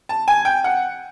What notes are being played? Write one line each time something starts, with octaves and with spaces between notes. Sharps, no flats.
A5
G#5
G5
F#5